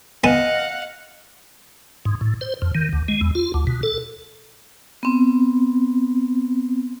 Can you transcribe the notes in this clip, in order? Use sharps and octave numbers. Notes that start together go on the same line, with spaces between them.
B3 D#5 F5 F#5 G#5 A5
G#2
A2
C5
F2
D#3
D2
G#3
E2
F4
D2
B2
A4
B3 C4